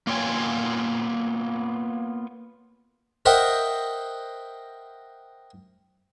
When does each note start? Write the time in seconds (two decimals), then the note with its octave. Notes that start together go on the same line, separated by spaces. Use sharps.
0.07 A#3 B3 F4 C#5 G5 G#5
3.26 A#4 C5 D#5 E5 F#5 G5